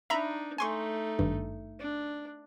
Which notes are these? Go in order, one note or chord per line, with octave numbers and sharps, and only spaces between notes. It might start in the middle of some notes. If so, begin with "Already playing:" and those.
D4 D#4 E5 A#5 B5
A3 D#4 G#5 C6 C#6
G#1 G2
D4